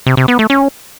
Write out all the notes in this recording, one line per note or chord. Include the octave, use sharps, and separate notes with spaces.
C3
C3
B3
A3
C#4